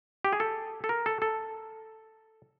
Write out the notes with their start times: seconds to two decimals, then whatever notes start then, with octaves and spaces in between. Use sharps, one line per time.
0.25 G4
0.33 G#4
0.40 A4
0.84 A4
0.89 A#4
1.06 A4
1.22 A4